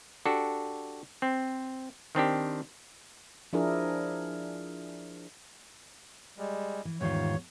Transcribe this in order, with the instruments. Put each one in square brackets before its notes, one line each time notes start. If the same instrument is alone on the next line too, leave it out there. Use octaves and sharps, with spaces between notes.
[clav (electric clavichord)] D4 F#4 G4 A4
C4
D#3 C4 D4 G4
[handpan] F3 D4 E4 G#4 A#4
[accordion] G3 G#3
[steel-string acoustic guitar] E3
[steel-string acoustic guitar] E2 G3 B3 [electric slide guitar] G#2 D#3 F4 [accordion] C#5